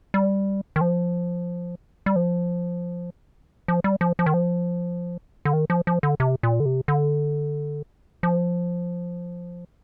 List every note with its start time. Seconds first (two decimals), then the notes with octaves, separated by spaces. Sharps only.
0.14 G3
0.76 D#3
0.81 F3
2.06 G3
2.16 F3
3.68 F3
3.84 G3
4.01 F3
4.19 F3
4.26 D#3
4.34 F3
5.45 D3
5.53 D#3
5.70 F3
5.87 F3
6.03 D3
6.20 C3
6.43 A#2
6.60 D3
6.65 C3
6.88 D3
8.23 F3